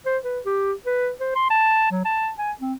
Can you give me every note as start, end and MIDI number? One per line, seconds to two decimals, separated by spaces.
0.06 0.18 72
0.24 0.39 71
0.46 0.73 67
0.86 1.10 71
1.20 1.34 72
1.35 1.46 84
1.50 1.90 81
1.91 2.01 54
2.05 2.31 81
2.38 2.52 80
2.60 2.74 60